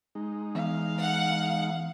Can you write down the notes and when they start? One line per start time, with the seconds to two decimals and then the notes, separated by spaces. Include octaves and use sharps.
0.15 G#3 D#4
0.55 E2 F5
1.02 F#5